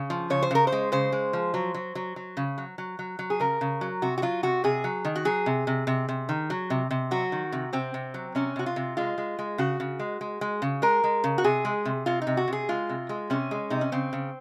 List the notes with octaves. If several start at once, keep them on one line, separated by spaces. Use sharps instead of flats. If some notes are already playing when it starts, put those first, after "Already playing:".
Already playing: C#3
F3
C#3 C#5
C5
C#3 A#4
C5
G#3
C#3 C5
G#3
F3
F#3
F#3
F#3
F#3
C#3
F#3
F#3
F#3
F#3
G#4
C#3 A#4
C#3
F#3
C3 F#4
F#4
F#3 F4
C3 F#4
C3 G#4
F#3
D#3
F#4
F#3 G#4
C3
C3
C3
C3
D#3
F#3
C3
C3
F#3 F#4
D#3
C3
C3 C4
C3
F#3
C3 C#4
C3 F#4
F4
C3
G#3 F4
G#3
G#3
C#3 F#4
C#3
G#3
G#3
G#3
C#3
G#3 A#4
G#3
C#3
F#4
C3 G#4
G#3
C3
C3 F4
D#4
C3
F#4
C3
G#4
G#3 F4
C3
G#3
C3 C#4
G#3
C3 D#4
C#4
C#3 C4
C#3